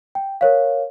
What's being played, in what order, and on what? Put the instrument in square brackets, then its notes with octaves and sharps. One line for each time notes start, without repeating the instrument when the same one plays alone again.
[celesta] G5
A#4 C#5 F5